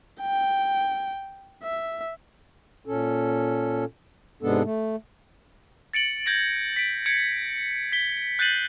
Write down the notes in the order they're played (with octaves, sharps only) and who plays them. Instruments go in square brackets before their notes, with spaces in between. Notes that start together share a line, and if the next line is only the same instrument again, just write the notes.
[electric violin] G5
E5
[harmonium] A#2 C#4 A4
G#2 C3 G#3 B3 D4 A4
A3
[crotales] A6 C#7 D7 F#7
G6 G#6 A#6 D7
B6 D7
G6 G#6 C#7 D7
B6 G7
F#6 G6 A6 C7 D#7 F#7